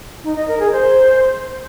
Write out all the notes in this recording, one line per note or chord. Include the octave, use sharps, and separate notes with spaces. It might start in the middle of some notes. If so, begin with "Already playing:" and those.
D#4
D#5
A#4
G#4
C5